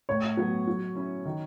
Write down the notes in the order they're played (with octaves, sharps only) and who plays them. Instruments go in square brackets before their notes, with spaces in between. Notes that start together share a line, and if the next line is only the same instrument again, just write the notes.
[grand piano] A2 [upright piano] C#5
[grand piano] F#3 B3
F#3
C#4 E4
D#3